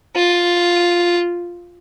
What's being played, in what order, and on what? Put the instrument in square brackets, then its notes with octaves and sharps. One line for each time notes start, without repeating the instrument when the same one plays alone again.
[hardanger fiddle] F4